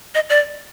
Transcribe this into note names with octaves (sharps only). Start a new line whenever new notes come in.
D#5
D5